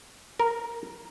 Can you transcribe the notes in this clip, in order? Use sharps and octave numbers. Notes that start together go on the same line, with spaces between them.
A#4